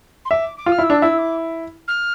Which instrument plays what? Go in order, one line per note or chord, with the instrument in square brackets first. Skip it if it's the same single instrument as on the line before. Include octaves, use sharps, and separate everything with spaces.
[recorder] C6
[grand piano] E5 [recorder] D6
[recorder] D6
[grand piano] F4
[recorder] F6
[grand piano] E4 [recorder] E6
[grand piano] D4
[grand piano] E4 [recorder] E6
[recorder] D6
F6